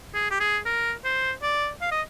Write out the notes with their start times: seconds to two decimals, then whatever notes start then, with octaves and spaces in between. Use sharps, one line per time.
0.14 G#4
0.31 G4
0.40 G#4
0.66 A#4
1.04 C5
1.42 D5
1.81 F5
1.91 D#5